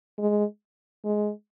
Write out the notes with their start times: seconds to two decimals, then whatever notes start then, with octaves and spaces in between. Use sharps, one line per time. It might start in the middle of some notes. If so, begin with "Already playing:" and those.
0.19 G#3
1.04 G#3